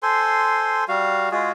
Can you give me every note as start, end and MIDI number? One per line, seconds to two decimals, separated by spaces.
0.03 0.84 69
0.03 0.84 72
0.03 0.84 80
0.03 0.84 84
0.88 1.29 55
0.88 1.29 66
0.88 1.29 77
1.32 1.52 56
1.32 1.52 65
1.32 1.52 66
1.32 1.52 68